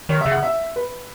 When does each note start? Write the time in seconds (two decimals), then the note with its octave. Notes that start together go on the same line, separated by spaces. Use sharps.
0.09 D#3 C#5
0.21 E5
0.26 C#3
0.31 F#5
0.43 E5
0.76 B4